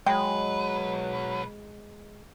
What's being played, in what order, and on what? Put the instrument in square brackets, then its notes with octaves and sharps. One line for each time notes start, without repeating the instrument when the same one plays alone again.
[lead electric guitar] B1 B4 [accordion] F#3 [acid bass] G#3 [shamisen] G5